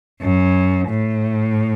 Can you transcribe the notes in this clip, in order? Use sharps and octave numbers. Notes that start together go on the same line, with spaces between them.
F#2
A2